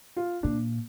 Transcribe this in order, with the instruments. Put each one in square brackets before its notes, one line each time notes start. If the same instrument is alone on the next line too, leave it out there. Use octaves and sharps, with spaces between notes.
[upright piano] F4
[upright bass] A#2 [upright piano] D4